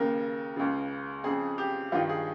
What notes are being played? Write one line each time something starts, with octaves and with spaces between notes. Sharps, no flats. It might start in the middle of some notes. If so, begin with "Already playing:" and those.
Already playing: D#2 C#3 A#4
C#2 C#3
F2 C#3 G#4
G4
G2 D#3 F4
G#4